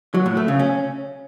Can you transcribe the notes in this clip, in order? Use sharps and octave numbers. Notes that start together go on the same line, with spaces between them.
F#3
A2
A3
C#3
C#4